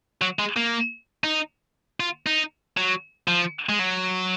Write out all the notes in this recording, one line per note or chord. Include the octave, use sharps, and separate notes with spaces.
F#3
G#3
A#3
D#4
F4
D#4
F#3
F3
G#3
F#3